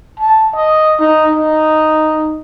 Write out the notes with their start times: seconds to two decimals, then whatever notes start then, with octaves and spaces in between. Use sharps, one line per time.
0.20 A5
0.55 D#5
1.00 D#4
1.35 D#4